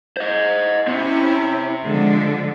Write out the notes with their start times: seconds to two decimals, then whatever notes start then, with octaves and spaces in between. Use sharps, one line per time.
0.17 C5 D#5
0.88 C3 C4 C#4 E4
1.84 D3 F3 G#3